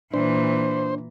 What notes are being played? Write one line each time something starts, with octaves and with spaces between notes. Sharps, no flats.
A#2 E3 D4 C5